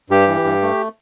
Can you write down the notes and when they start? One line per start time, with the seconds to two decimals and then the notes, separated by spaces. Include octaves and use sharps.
0.10 G2 G4
0.28 E3
0.45 G2
0.62 A3